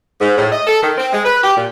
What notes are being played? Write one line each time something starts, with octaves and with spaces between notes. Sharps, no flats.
G#2
A2
D#5
A4
D#3
C4
G#3
B4
G4
A#2